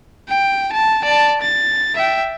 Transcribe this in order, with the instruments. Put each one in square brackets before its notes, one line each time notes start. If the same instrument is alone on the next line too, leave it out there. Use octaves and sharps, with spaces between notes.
[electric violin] G5
A5
D5 A5
A6
E5 G5